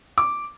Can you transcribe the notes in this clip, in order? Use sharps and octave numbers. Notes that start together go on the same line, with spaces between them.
D6